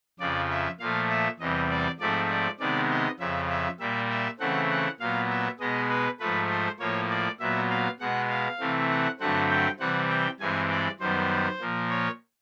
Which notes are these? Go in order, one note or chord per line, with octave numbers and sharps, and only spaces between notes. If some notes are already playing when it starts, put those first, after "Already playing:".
F2 C#3 F3 D5
E5
A#2 F3 A3 F5
E5
E2 C3 E3 G3 D#5
D5
G#2 F3 A3 C4 D5
D5
C3 D#3 G#3 B3 D5
D#5
F2 C#3 F3 E5
E5
A#2 G3 A#3 E5
E5
C#3 E3 A3 C4 F#5
F#5
A#2 F#3 B3 F5
E5
B2 G#3 B3 D#5
B4
G#2 F3 A3 B4
C5
A2 F3 A#3 C#5
D5
A#2 F#3 B3 E5
F5
B2 G#3 B3 F#5
F5
C3 E3 A3 C4
F#5
G2 D3 F#3 A3 C4 F#5
G5
C3 E3 G3 C4 F#5
G5
G2 E3 G#3 C4 G#5
D5
F#2 D#3 G3 B3 C5
A#2 F3 A#3
C#5